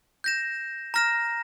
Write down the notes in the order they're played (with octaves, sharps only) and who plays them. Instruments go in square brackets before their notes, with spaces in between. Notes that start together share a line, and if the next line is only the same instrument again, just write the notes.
[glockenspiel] G6 A#6 E7
A#5 F6 A#6 E7